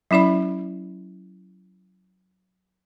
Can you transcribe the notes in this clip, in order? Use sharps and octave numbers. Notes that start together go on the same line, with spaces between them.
F#3 C#4 E4 D5 B5